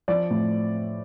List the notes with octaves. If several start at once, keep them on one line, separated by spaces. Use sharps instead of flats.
F3 D5
A2